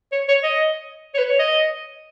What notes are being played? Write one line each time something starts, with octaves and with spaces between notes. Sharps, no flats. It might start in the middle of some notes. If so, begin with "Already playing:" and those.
C#5
C#5
D#5
C#5
B4
C#5
D#5